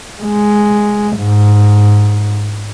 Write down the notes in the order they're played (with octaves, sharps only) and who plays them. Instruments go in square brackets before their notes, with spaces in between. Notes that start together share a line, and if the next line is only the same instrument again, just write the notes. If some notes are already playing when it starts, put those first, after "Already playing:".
[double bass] G#3
G#2